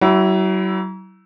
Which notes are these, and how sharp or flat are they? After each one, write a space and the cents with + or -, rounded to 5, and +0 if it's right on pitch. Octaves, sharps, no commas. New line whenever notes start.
F#3 +40 E4 +0